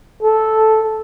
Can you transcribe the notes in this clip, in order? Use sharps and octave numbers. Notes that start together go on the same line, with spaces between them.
A4